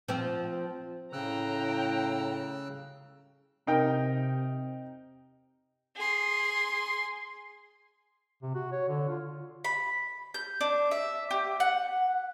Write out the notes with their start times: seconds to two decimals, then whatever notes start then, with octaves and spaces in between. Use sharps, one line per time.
0.08 F3 C4
1.13 A2 C#3 G5 A#5 E6 F#6
3.67 C3 D#4 A#4 G5
5.96 G#4 C6
8.43 C3
8.55 F#4
8.72 C#5
8.88 D3
9.09 F4
9.64 B5
10.34 G6
10.61 D4
10.91 E5
11.31 G4
11.60 F#5